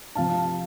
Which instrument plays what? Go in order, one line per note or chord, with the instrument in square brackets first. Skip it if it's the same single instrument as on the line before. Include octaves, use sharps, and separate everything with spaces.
[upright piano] C3 F3 F5 A5